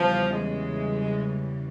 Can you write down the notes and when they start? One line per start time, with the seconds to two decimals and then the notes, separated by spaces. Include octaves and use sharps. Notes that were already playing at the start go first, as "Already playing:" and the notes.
Already playing: E2 C#3 E3 F3 G3
0.32 G#3